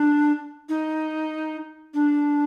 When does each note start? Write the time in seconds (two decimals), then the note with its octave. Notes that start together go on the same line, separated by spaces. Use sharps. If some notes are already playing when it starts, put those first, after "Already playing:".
Already playing: D4
0.69 D#4
1.94 D4